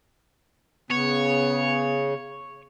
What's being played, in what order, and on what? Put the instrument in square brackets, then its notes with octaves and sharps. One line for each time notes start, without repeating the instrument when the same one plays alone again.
[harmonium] C#3 [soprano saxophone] B3 [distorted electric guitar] C#5